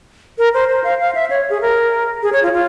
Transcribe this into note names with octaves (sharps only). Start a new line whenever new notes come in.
A#4
C5
C5
F5
F5
E5
C#5
G#4
A#4
G#4
C#5
F4
F4